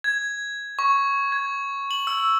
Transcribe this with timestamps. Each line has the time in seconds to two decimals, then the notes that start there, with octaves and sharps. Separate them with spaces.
0.04 G#6
0.79 C#6
1.32 G#6
1.91 F#7
2.07 E6